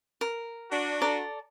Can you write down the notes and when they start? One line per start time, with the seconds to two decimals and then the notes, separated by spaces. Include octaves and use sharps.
0.21 A#4
0.71 D4 F#4
1.02 A4 D5 A#5